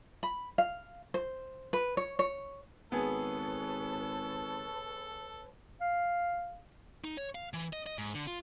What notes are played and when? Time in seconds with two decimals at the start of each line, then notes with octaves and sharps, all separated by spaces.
0.23 B5
0.58 F5
1.14 C5
1.73 B4
1.97 C#5
2.19 C#5
2.92 G#1 B3 G#4 A4 B4 C#5 A5
5.81 F5
7.04 D#4
7.17 C#5
7.35 F5
7.53 E3
7.73 D#5
7.86 D#5
7.98 G#2
8.15 D3
8.27 F4